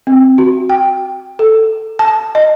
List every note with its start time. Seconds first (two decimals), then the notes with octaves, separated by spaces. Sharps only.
0.07 C4
0.38 F#4
0.69 G5
1.39 A4
1.99 A5
2.35 D#5